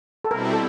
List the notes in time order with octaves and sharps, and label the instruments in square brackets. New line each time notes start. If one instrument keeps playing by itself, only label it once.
[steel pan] A4
[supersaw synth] B2 G3 C4 E4 [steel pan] A#4
[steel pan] A4